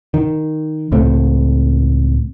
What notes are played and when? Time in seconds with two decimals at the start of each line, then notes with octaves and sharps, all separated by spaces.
0.14 D#3
0.92 C#2 A2 A3 C4